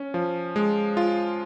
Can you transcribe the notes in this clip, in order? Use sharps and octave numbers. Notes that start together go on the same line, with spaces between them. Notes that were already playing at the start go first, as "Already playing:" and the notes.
Already playing: C#4
F3
G#3
F4